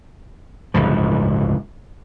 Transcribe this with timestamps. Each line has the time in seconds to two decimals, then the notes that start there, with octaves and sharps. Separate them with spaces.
0.74 D1 G1 C#2 F3